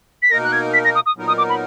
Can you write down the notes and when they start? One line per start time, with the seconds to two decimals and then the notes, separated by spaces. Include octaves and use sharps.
0.23 B6
0.31 B2 A#3 D#4 A#4 A#6
0.44 F#6
0.52 G#6
0.74 B6
0.85 A#6
0.95 D#6
1.06 D#6
1.17 A#2 F#3 B3 D#4 A#4
1.28 D#6
1.38 D6
1.49 B5